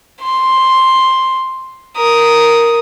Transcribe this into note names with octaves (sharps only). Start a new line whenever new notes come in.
C6
A#4 D#6